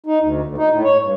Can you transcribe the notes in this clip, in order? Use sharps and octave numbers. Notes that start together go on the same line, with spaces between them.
D#4
D2
D2
D#4
A2
C#5
G2